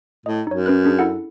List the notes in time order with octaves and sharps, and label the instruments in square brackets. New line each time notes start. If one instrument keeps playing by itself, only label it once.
[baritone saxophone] A2 [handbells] D#5
[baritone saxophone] F#2 [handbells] D#4 C#5
[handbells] C#4 B4 F#6
C#4 D4 G#4
E4 A4 F#5